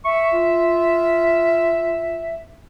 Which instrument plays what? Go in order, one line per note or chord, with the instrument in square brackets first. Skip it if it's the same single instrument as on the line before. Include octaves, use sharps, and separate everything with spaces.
[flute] E5 [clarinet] C#6
[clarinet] F4